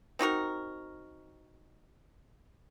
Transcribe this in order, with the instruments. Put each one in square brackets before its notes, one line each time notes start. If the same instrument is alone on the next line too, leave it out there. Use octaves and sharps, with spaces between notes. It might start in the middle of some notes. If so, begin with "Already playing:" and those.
[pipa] C4 D#4 F#4 A#4